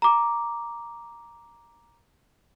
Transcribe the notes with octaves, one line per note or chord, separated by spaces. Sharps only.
A#5 D6